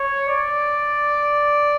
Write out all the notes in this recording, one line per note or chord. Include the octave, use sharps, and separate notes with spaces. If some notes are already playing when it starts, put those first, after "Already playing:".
Already playing: C#5
D5